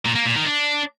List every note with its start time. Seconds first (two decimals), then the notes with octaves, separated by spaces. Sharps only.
0.06 A#2
0.16 A#3
0.26 A#2
0.35 D#3
0.45 D4